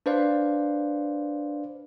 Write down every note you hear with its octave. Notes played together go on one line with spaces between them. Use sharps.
D4 B4 C5 D5 F5